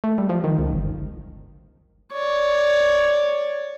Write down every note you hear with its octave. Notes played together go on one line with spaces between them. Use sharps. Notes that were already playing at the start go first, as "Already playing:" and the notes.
A3
G3
F3
D#3
C#2
G1
C#5 D5